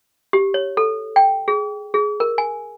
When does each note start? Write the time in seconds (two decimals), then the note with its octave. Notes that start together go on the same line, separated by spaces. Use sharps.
0.33 G4
0.54 C#5
0.77 A4
1.16 G5
1.48 G#4
1.94 G#4
2.20 A#4
2.38 G#5